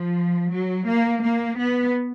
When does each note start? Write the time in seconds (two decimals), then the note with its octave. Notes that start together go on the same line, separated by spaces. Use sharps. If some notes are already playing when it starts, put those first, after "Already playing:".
Already playing: F3
0.51 F#3
0.86 A#3
1.22 A#3
1.57 B3